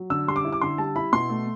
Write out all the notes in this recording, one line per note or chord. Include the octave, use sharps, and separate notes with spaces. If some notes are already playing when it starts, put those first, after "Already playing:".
Already playing: F#3
D3 E6
G3 C6
D6
E4
D6
D3 C6
G3 A5
E4 B5
B2 C6
A3